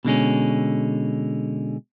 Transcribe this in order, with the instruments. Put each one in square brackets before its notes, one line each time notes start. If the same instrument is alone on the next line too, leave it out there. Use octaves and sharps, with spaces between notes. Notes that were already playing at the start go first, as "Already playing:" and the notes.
[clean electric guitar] B2 D3 G#3 C#4